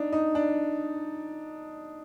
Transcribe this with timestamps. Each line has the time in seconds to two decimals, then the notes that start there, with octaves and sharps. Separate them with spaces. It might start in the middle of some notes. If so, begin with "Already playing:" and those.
Already playing: D4 D#4
0.12 D#4
0.35 D4